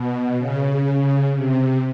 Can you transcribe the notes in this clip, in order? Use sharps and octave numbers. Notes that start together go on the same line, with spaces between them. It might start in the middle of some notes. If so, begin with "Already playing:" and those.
Already playing: B2
C#3
C3